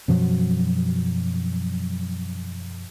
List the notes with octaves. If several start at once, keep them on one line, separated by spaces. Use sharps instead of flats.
F#2 B2 F3 F#3